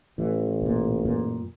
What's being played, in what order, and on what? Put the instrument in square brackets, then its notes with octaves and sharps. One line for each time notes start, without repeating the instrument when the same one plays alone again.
[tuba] A1 [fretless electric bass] E3
[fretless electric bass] B1 A#2
F#2 A#2